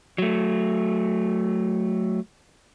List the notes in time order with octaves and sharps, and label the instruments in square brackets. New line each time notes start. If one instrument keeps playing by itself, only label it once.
[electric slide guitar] F#3 A3